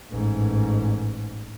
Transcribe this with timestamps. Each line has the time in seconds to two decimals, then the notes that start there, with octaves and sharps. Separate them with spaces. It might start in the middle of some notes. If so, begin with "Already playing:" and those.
0.11 A1 G#2